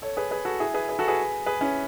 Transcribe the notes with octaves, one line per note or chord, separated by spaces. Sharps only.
A4 C#5
G#4 B4
G#4 B4
F#4 A4
E4 G#4
G#4 B4
G#4 B4
F#4 A4
G#4 B4
G#4 B4
C#4 E4